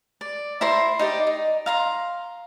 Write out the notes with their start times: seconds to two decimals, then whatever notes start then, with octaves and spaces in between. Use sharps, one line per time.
0.21 D5
0.61 E4 C5 A#5 C6
0.99 D#4 G4 D5
1.27 D#4
1.66 F5 A#5 C6